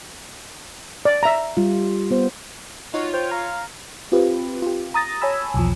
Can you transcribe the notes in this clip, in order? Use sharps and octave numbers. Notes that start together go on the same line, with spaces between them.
D5
E5 A#5
G3 F4
B3 C5
D#4 F4 F#4 C#5
C5 G5
F5 A#5
C4 F4 G4 B4
F4 G4
A#5 D#6 A6 A#6
C#5 G#5 A5 B5 E6
B1 E2 F3